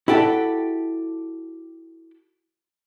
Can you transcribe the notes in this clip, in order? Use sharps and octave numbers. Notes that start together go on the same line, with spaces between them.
E4 F#4 G4 A4 D5